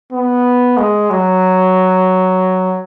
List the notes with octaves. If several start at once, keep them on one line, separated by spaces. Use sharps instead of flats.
B3
G#3
F#3